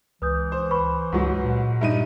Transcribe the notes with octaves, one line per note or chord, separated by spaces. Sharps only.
C#2 E3 B4 D#6 G6
C5
B4 B5 C#6
C#2 G#2 F#3 C#6
A#2
G2 D#4 E5 D#7